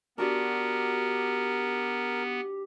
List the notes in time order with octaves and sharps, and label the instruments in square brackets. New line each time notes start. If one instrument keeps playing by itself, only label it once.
[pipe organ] B3 [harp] D4 F#4 D5 [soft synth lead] G4 [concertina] A#4